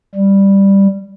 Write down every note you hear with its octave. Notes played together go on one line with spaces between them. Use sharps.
G3